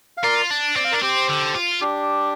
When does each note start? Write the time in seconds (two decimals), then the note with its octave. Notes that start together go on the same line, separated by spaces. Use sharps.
0.17 F5
0.23 F4 A#4 D5
0.50 D4
0.76 C4 D5
0.85 F5
0.92 D4 A#4 D5
1.02 C4 G4 C5
1.29 D3
1.55 F4
1.81 D4 G4